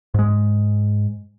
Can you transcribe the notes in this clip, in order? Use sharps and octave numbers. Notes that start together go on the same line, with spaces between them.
G#2 G#3